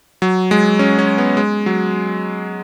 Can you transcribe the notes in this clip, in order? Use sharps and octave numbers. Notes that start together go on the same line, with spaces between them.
F#3
G#3
C#4
C#4
B3
G#3
F#3